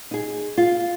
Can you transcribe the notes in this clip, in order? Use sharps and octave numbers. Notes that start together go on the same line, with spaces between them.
D#4 G#4
F4